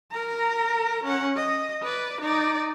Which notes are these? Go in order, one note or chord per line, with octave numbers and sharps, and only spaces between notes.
A#4 A#5
C#4 F#5
D#5
B4 D5
D#4 D5